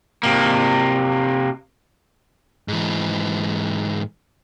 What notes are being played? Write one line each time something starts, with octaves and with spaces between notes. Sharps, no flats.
C3 A#3
G#2 E3